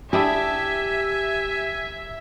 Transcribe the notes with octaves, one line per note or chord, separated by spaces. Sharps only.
D4 E4 G4 G#4 E5 G#5